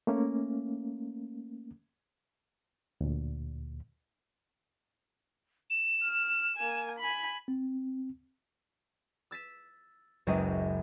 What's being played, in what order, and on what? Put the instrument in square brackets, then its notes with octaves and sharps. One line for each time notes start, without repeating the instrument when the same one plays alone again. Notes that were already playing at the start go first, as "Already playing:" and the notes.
[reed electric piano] A3 A#3 C#4
D2 A#2
[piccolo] E7
[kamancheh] F6
A#3 G#5
G#5 B5
[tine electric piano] C4
[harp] E6 A6 B6 E7
F#1 C#2 F#2 G#3 D#5 A#5